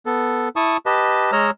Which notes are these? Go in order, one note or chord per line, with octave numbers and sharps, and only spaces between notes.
B3 A4
E4 A5 C#6 D#6
G4 B4 D#5 A5
G#3 C#5 D#5 A#5 E6 F6